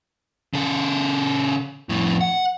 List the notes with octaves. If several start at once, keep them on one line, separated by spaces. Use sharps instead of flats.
C#3 A4
F2 A2
F#5